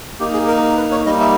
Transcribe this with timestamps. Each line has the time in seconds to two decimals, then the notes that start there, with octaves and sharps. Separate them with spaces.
0.20 A#3 D#4 G4
0.33 G#4
0.48 A#4
0.77 B4
0.91 C#5
1.06 G3 A#3 D#4 D#5
1.20 E5